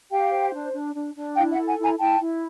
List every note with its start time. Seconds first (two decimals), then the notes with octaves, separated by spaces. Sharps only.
0.11 G4 F5 G5
0.31 C5
0.53 D4
0.73 D4
0.95 D4
1.15 D4
1.36 E4 F5 G5
1.52 E5 F#5
1.57 A4
1.67 F#5 G#5
1.78 E4
1.83 G#5 A#5
1.99 E4 G5 A5
2.20 E4